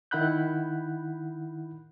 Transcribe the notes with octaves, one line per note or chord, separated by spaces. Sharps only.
D#3 E4 F#5 B5 F#6 G6